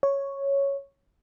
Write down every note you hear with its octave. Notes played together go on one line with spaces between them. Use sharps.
C#5